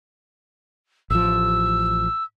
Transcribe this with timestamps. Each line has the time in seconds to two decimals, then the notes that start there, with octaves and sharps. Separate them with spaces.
1.10 A1 F3 E6